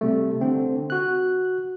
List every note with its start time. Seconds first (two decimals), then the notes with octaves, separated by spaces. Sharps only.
0.01 C3 G3 A3
0.41 D3 C4
0.90 F#4 F#6